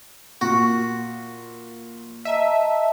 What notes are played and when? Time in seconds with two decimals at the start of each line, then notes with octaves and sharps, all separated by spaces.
0.41 A#2 F#4
2.25 D#5 E5 A5 A#5